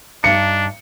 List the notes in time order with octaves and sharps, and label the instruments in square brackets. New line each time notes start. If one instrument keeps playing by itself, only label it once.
[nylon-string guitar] G2 D#4 [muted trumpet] D4 [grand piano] C#7